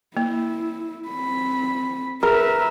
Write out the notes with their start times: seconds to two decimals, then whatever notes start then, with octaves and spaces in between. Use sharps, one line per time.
0.17 A#3 E4
1.08 C4 B5
2.23 G#4 A#4 B4 E5